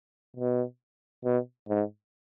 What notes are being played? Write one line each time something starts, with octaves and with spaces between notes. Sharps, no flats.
B2
B2
G#2